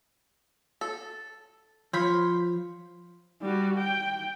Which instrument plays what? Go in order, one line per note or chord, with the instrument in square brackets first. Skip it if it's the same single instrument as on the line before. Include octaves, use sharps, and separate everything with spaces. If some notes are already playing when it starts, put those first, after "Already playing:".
[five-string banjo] A4
[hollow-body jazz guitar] F3 [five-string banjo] C5 C#5 B5
[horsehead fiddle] G3 F#4
G5